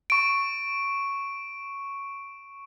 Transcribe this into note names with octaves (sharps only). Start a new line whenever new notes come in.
C#6 D7